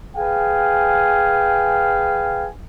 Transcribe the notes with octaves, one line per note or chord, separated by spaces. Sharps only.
G#4 B4 F5 G5 G#5